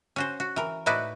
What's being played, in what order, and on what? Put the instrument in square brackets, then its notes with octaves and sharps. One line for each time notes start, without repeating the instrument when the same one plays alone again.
[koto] C#4 F#4 C5
F#4
E3 A#4
A2 D#4 E4 F#4 B4 D5